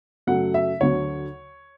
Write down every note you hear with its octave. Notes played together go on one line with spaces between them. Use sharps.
F#2 C#3 F#3 A3 F#5
E5
D2 D3 F#3 C#5